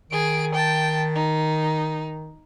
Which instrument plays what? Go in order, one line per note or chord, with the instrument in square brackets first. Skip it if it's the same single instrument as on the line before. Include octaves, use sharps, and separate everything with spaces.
[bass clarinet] D#3 [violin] G#4 D7
[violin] G5 A5
D#4